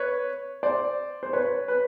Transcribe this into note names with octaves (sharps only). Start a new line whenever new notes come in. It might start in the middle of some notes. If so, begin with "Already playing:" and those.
Already playing: B4 C#5
C5 D5
C5
B4 C#5
B4